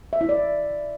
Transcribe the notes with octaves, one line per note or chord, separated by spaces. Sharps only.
E5
E4
D5